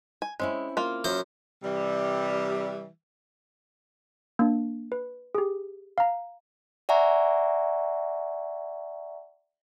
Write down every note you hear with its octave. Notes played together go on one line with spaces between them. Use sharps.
G#5
G#3 C4 C#4 E4
A#3 F4
F#2 C5
C3 E3 G3
A#3 D4
B4
G4 G#4
F5 A#5
D5 E5 F#5 G#5 A#5 C#6